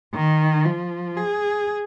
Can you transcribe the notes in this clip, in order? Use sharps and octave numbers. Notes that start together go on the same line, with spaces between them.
D#3
F3
G#4